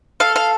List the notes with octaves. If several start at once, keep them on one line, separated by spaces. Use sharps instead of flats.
A4 F5
F5